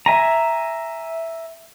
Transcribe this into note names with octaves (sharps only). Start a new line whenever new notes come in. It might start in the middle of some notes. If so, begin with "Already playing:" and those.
E5 G#5 A#5